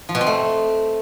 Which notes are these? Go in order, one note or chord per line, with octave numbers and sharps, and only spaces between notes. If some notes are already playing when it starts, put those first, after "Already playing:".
F3
B2
C4
A3